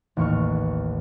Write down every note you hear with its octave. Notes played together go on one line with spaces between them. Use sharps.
A1 D#2 C#6 F6